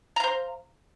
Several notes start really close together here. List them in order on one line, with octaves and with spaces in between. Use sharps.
A#5 F5 C5